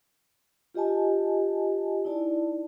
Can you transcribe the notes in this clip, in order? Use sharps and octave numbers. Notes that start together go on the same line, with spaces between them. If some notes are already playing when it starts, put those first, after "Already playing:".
F4 G4 D#5 G#5 A5
D#4 E4 D5 A5